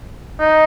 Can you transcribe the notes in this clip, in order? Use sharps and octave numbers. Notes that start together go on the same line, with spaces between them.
D#4